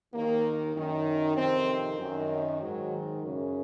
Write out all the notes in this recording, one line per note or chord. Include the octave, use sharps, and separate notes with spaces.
D#2 D#3 A#3
F#2 D#3
F2 C3 D#3 C4
F#2 D#3
G#2 D#3 F#3
F#2 C#3